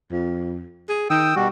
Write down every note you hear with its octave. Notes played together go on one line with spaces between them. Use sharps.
F2
G#4
D#3 G5 D#6 E6
B2 G3 F#4